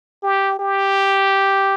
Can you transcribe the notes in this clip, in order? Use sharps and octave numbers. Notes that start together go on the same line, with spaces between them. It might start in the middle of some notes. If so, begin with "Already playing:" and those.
G4
G4